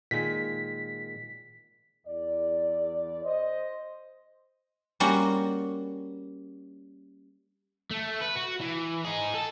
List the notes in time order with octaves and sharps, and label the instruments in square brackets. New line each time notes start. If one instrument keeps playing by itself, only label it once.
[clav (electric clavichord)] A#2 D#3 G#3 [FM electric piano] B6
[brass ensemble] E2 D5
C5 D#5
[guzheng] G3 A#3 C#4 F#4
[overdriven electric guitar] A3
B4
F#4
E3
D#4 G#4
A4 A5